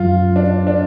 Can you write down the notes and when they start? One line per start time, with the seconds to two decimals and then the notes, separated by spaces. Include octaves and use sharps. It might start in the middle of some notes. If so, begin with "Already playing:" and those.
Already playing: F#2 F4
0.36 D4
0.67 D4